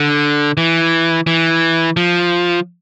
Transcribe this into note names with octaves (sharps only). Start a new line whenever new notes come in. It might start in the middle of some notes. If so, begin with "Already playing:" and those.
Already playing: D3
E3
E3
F3